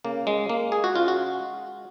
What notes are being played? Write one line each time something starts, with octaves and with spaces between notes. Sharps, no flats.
C#3 A#3
G#3
G#3 A#3
G#4
F#4
C#3 F4
F#4
G#3